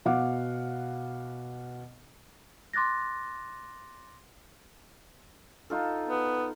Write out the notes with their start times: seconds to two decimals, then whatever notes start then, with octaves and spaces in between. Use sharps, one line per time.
0.05 B2 F5 F#5 D6
2.73 C6 D6 F#6 A6 A#6
5.70 D#4 F4 A4
6.08 B3